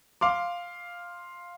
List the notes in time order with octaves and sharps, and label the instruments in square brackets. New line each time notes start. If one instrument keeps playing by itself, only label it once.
[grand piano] F5 C6 D6